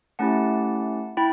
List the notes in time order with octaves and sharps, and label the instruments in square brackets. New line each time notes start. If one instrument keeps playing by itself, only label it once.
[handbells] A3 C#4 E4 G4 F#5 A5
E4 G5 B5